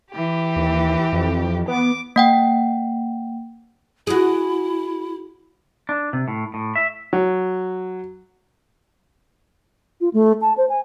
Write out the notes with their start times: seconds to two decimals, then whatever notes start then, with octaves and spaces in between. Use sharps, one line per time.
0.11 E3 G4
0.56 D#2
1.12 F2
1.68 B3 D6
2.16 A#3 F#5 G5
4.07 E4 F#4 G#4
5.89 D4
6.13 C3
6.28 A2
6.54 A2
6.76 E5
7.13 F#3
10.01 F4
10.14 A3
10.41 A5
10.57 C5
10.69 G#5